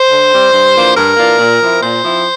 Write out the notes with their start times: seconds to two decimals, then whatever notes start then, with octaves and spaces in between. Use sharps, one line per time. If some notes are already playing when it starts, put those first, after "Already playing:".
Already playing: C5
0.10 D3
0.31 G3 C4
0.52 G2
0.75 E3 A#3 D4 F4
0.96 G2 A#4
1.17 E3 A#3 D4 F4
1.38 A#2
1.60 F3 C4 E4
1.81 A#2 C5
2.03 F3 C4 E4